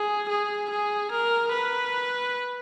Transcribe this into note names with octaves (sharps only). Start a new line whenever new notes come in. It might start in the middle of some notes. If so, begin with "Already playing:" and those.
Already playing: G#4
G#4
G#4
A#4
B4